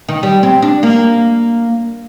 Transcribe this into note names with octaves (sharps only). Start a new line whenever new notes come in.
D#3
G3
C4
D4
A#3